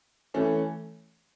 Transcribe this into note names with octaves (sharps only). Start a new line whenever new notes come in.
E3 A3 C#4